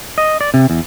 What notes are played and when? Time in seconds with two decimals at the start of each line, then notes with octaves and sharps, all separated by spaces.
0.18 D#5
0.41 D5
0.54 C3
0.70 E2